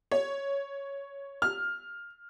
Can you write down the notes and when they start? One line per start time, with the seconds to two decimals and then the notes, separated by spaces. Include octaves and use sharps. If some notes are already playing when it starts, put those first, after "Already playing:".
0.12 C#5
1.42 F6